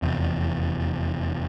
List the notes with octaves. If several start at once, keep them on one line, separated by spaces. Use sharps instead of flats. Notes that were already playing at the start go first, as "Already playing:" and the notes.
F1 E2